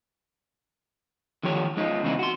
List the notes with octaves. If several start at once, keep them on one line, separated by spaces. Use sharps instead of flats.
D3 D#3 F3 G4 C#5
G#3 D#4 F4
E2 C#3 C4 D#4 E4
F#4 C6